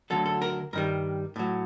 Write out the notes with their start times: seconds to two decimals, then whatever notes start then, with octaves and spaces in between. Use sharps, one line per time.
0.10 D2 D3 F#3 A4
0.26 A4
0.42 A#4
0.73 G2 D#3 G3 A#4
1.36 A2 F#3